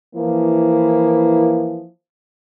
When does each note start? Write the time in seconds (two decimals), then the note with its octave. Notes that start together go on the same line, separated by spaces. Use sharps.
0.15 E3 F3 A#3 E4